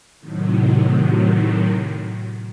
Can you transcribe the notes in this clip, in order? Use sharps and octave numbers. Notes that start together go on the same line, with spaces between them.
A2 C3 D#3 F#3